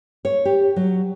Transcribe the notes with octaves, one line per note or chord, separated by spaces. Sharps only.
C#5
G4
F#3